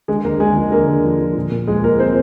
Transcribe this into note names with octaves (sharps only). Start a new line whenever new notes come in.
D3 G#3 G#4
D3 A#3 A#4
D3 G#3 G#4
F3
D3 A#3 A#4
D3
F3
F3
A#2
A#2
F3 G#3 G#4
A#2 A#3 A#4
F3 C4 C5